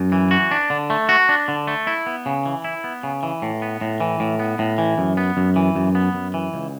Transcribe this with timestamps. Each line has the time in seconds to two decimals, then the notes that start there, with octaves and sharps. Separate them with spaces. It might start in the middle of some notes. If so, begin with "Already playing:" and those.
Already playing: F#2
0.12 E3
0.31 F#4
0.51 D4
0.70 D3
0.90 A3
1.09 F#4
1.29 D4
1.48 D3
1.67 A3
1.87 E4
2.06 B3
2.26 C#3
2.46 E3
2.64 E4
2.84 B3
3.03 C#3
3.23 E3
3.42 A2
3.62 B3
3.81 A2
4.00 E3
4.20 A2
4.39 B3
4.59 A2
4.78 E3
4.98 F#2
5.17 B3
5.37 F#2
5.56 E3
5.76 F#2
5.95 B3
6.15 F#2
6.34 E3
6.54 C#2